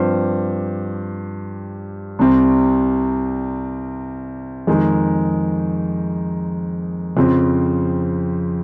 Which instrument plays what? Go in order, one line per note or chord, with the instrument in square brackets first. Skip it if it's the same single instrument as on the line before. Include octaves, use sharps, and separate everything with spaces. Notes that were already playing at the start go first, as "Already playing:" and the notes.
Already playing: [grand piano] G2 F3 C4 G4 C5
C2 C3 G3 C4
F2 D#3 G#3 D#4
F2 C#3 F3 C4